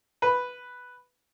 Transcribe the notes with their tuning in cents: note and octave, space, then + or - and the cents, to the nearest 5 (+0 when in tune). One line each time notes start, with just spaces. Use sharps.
B4 +0